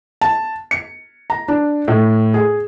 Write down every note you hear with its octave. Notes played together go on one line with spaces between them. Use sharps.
A5
C#7
A#5
D4
A2
G#4